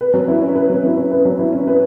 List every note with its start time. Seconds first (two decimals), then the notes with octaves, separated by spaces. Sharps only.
0.01 B4
0.14 F#3
0.28 E4
0.42 C#4
0.55 B4
0.70 F#3
0.83 E4
0.97 C#4
1.12 B4
1.25 F#3
1.39 E4
1.53 C#4
1.67 B4